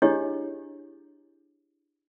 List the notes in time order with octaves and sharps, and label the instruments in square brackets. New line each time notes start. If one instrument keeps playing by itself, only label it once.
[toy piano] D4 E4 G4 G#4 C#5 D#5